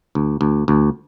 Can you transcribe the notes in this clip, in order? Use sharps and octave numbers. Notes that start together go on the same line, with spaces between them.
D2
D2
D2